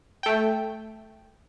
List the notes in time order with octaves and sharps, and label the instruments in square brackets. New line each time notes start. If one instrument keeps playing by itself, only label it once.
[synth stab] A3 G5